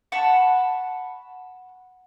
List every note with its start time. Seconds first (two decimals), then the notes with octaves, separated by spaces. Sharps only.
0.12 F#5 A5 B5 C#6